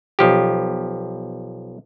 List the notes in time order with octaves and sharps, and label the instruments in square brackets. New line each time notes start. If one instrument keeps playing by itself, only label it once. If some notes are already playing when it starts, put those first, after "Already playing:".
[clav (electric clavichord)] B1 F3 G4